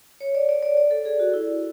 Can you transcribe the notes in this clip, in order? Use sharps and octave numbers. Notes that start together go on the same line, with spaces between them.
C#5
D5
D5
D5
D5
A4
G#4
F#4
E4